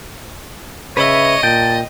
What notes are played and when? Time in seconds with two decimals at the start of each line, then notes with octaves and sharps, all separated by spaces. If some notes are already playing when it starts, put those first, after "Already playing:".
0.97 C#3 B4 C#5 D#5 E5
1.43 A#2 G5 A5